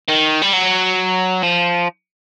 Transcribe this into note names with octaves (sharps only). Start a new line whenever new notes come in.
D#3
G3
F#3
F3